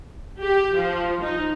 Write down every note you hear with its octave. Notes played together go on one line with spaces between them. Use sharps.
G4
F3
D#4